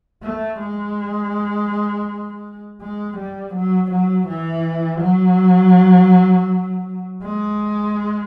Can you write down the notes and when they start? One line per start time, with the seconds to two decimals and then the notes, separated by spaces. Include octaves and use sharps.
0.23 A3
0.60 G#3
2.81 G#3
3.18 G3
3.55 F#3
3.91 F#3
4.28 E3
5.01 F#3
7.23 G#3